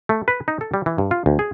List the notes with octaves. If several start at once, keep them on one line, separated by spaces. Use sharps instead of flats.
A3
B4
D#4
A4
G3
E3
G2
F4
D2
G#4